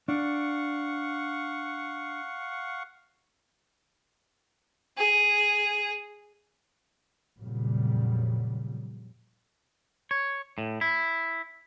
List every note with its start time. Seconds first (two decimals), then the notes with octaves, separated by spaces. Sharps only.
0.08 D4 F5 F#5 C#6
4.97 G#4
7.40 F2 A#2 C#3 F#3 G3
10.11 C#5
10.58 A2
10.81 E4